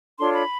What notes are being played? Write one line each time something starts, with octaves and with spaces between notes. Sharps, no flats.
D4 F4 A4 C#5 C6
B5